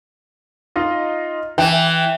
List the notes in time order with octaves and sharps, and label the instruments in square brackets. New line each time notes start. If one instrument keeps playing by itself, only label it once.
[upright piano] D#4 F4 D#5
[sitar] E3 [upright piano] G5